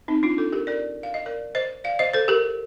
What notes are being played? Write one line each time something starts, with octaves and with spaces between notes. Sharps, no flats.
C4 D#4
D4 F4
F4 A4
G4 A#4
A#4 D5
F5
D#5
A#4 D5
C5 D#5
D5 F5
C5 D#5
A4 C5
G4 A#4